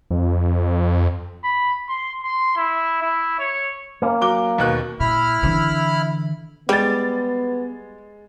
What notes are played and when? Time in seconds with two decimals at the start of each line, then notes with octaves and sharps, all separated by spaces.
0.10 F2
1.44 B5
1.89 C6
2.23 C6
2.57 E4
3.02 E4
3.39 C#5
4.02 A#3 C#4
4.21 F#3 D6 G7
4.58 D#2 B2 F#6
5.00 A#2 E4 B5 F6
5.43 D3 E3
6.69 G3 G#3 B3 A6